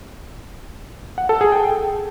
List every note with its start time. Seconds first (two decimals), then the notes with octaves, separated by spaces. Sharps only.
1.18 F#5
1.29 A4
1.41 G#4
1.52 G5